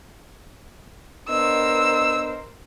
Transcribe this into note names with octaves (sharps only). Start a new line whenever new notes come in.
B3 D4 A#4 C5 D#5 E6